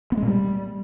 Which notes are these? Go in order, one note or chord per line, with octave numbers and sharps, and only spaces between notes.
B3
G#3
A#2
G3